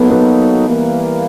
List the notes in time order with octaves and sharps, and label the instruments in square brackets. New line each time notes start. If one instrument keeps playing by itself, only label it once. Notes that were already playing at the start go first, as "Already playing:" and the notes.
Already playing: [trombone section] F#3 A#3 D#4 F#4 A4 [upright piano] B3
[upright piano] B3
[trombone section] E3 G3 A#3